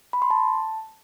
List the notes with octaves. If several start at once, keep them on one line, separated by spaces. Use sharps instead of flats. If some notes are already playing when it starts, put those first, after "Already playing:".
B5
C6
A5